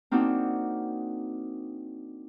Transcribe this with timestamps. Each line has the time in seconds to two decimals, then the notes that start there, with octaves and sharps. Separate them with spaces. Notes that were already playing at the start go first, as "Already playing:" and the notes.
0.11 A#3 C4 D4 D#4 F#4